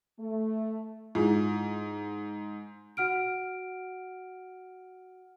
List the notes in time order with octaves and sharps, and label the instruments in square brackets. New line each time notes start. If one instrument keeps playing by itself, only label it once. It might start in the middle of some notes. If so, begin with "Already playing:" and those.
[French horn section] A3
[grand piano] G#2 [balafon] E4 F4 G#4
[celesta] F#4 F#5 F6 D7